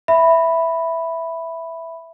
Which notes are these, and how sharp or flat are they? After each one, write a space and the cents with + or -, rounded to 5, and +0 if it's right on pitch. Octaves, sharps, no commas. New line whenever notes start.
E5 +0 B5 +0